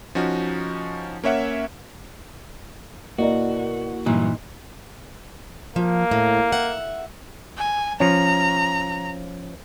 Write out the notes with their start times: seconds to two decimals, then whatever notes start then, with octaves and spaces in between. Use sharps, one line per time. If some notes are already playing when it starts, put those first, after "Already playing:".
0.15 F3 C#4 D#4 F#4
1.24 A#3 C#4 C#5 E5 F#5
3.18 B2 A#3 E4 F#4 A#4 D5 D#5
4.06 G2 A#2 E3 F#3 D#4
5.76 F3 A#3
6.11 A2
6.52 E5 F#5
7.57 G#5
8.00 F3 C#4 A#5